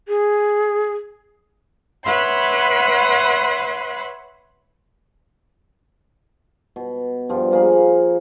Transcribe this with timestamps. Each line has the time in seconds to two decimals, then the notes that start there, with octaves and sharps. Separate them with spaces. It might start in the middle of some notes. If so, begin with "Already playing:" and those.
0.08 G#4
2.04 B4 C#5 E5 F#5 B5 C6
6.76 B2
7.29 G2 F3 G3 B3
7.51 F3 A#3 G#4